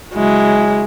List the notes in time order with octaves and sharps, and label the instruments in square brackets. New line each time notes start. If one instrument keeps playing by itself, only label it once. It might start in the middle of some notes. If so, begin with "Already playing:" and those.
[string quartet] C#3 F#3 E4 [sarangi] G#3